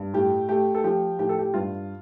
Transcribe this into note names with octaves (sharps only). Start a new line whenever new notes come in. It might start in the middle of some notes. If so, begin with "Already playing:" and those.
Already playing: G2
A2 G4
A3 G4
A4
F3 G4
A2 G4
A4
G4
G2 F4